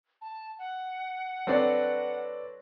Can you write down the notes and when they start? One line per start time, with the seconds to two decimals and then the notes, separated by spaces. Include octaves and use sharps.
0.21 A5
0.59 F#5
1.47 F#3 C4 D4 A4 B4 D5